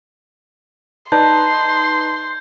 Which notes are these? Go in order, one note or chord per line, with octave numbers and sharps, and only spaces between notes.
D#4 B4 D5 A5 C6 G6